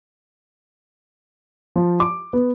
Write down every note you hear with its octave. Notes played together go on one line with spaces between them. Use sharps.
F3
D6
B3